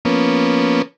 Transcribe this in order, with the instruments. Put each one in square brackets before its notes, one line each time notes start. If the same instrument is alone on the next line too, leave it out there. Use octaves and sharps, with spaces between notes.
[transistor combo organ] F3 A#3 B3 C#4